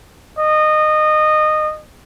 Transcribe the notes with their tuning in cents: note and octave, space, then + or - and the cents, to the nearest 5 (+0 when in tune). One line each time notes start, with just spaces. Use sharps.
D#5 -20